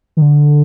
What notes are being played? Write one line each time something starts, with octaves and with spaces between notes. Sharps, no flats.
D#3
D3